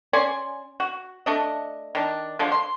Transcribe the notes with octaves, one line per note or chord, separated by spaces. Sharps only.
C#4 D5 G#5 C6
F#4
A3 D4 D#5
D#3 D4
D3 F3 G#3 D4
C6